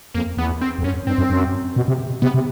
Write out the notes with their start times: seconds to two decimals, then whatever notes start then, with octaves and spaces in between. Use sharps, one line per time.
0.14 F2 A#3
0.37 E2 B3
0.61 C4
0.79 F2
0.84 F#2 C#4
1.07 G2 C4
1.18 F#2
1.30 F#2
1.76 B2
1.88 C3
2.22 C3 B3
2.34 C3